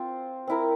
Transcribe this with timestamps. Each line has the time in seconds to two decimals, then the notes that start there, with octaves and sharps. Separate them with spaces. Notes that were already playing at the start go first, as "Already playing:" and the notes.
Already playing: C4 F4 C5
0.48 C4 E4 A#4